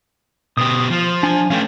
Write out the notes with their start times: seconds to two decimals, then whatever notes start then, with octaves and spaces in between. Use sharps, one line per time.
0.57 B2 G4 D#6
0.90 F3
1.23 D4 G#5
1.50 A3 C#4 F5 G5